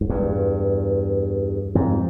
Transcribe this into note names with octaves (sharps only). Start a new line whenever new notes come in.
G#2
E2 G2
F2 G#2